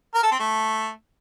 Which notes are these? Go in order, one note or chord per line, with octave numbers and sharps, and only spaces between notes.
A#4
A4
C4
A3